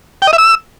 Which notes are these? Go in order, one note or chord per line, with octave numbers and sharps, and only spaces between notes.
G5
D#5
E5
E6